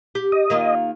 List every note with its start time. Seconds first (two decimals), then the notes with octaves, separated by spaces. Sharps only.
0.15 G4
0.32 D#5
0.50 D#3 A#3 F4